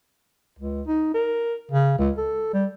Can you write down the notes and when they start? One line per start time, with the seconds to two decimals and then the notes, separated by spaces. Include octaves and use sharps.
0.59 C#2
0.87 D#4
1.14 A#4
1.71 C#3
1.98 C#2
2.18 A4
2.53 G3